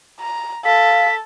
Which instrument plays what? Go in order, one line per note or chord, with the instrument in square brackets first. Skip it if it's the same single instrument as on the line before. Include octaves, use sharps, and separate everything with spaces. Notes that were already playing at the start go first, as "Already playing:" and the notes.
[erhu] A#5
[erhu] A4 [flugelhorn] F5 [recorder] B6